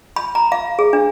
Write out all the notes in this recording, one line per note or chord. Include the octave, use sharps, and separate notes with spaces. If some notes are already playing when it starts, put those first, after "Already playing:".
B5
A#5
F5
G#4
D4